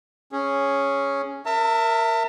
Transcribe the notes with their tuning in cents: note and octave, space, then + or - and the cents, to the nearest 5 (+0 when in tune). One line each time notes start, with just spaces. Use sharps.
C#4 +0 G#4 +0
A#4 +0 E5 +0 A5 +45